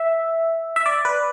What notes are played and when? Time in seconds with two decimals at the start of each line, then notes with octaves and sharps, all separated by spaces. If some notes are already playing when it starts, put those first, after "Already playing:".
Already playing: E5
0.76 E5
0.86 D5
1.05 B4